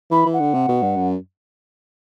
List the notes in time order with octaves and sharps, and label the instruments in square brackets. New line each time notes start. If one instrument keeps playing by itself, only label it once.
[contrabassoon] E3 [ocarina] B5
[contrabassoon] E3
[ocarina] F#5
[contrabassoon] D3
C3
B2
G2
F#2